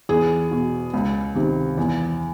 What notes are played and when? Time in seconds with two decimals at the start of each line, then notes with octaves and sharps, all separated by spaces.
0.09 E2 G#4
0.51 B2
0.93 C#2
1.35 C3 D#3
1.77 E2